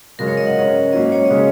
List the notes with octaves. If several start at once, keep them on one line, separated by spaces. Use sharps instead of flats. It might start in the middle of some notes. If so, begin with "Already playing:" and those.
F#2 C#3 G#3 A#4
C#5
D#5
F#5
G#2 G#3 C#4
G#2 F#3 A#3 C#4 D#5
C#5
D#5
C#3 G#3 C#4 G#4